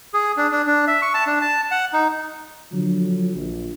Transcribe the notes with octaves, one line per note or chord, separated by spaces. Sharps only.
G#4
D4
D4
D4
E5
C#6
A5
D4
A5
F#5
D#4
D3 F3 F#3
A#1